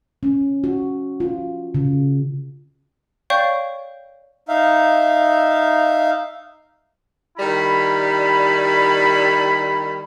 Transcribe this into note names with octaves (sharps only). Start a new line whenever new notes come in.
C#4
F#4
F4
C#3
C#5 D5 F5 G5 C#6 G6
D#4 E5 F5
D#3 G3 E4 B5